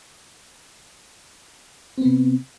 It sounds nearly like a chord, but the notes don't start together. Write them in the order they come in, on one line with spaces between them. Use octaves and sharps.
C4 B3 C3